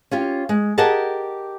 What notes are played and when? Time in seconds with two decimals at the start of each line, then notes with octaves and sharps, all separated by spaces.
0.11 C#4 F4 G4
0.49 G#3
0.78 G4 G#4 A#4 D#5 F#5 A5